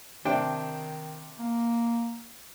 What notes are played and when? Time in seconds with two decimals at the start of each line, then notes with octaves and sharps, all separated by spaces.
0.25 C3 D#3 D4 G5
1.39 A#3